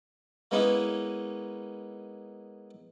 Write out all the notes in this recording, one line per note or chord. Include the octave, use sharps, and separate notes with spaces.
G#3 A#3 B3 C#4 D#4 E4